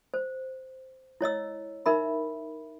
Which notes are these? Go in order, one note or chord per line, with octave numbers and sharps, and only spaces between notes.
C5
E4 C#5 D#5 E6
D#4 A#4 E5 B5